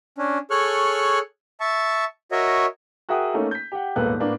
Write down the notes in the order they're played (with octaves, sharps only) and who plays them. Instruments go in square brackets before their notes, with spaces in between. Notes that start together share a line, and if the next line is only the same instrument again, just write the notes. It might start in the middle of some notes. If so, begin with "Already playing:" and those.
[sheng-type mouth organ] C#4 D4
G#4 A4 C#5 C#6 F6 F#6
E5 A5 C#6
F#4 A#4 C#5 D#5 E5
[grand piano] F#4 G#4 A#4 E5 G5 D#6
A3 A#3 C#4 D#4 A4
G6 B6
G4 F#5
D#1 G#2 A#3 B3 A4 F#6
A2 A#3 B3 D4